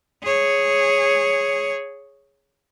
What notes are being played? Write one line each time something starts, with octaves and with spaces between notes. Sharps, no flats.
G#4 C#5